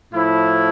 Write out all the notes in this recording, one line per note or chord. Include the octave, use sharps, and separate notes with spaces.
A2 F3 E4